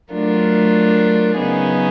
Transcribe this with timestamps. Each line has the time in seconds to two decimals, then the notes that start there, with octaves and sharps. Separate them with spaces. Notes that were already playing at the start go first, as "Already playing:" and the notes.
0.11 F#3 A3 D4 F4 A#4
1.37 C#3 F#3 B3 D#4 G#4